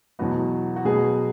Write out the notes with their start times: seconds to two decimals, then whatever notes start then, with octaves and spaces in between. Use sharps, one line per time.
0.19 E2 B2 F#3 B3 F#4
0.76 F#4
0.85 B2 F#3 B3 G#4